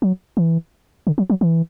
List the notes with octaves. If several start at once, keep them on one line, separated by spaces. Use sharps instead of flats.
F#3
E3
D3
F#3
F#3
E3